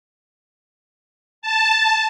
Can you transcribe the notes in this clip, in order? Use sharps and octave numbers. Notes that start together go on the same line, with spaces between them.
A5